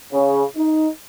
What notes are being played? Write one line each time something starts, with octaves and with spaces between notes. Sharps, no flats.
C#3
D#4